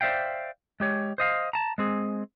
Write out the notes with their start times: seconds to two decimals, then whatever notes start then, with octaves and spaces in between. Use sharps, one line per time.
0.01 C5 D5 E5 F5 G5
0.80 G#3 G4 C#5
1.18 C5 D#5 F5
1.53 A5 A#5
1.78 G#3 C4 G#4